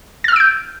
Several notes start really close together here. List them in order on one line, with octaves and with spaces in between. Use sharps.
A6 F6 E6 D7 G6